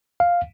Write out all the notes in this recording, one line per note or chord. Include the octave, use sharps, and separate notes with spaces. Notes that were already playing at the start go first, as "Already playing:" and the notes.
F5